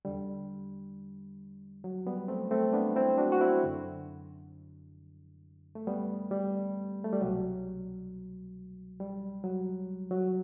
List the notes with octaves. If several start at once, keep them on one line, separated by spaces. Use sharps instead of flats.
E2 D3 G3
F#3
G3 B3
A3 C4
A3 C4
B3 D4
C4 E4
D4 F#4
F#4
C4 E4
F#2 D3
A3
G3 B3
G3
A3
G3
C2 B2 F#3
G3
F#3
F#3